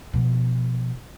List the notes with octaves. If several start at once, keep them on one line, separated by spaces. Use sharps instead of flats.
B2 F3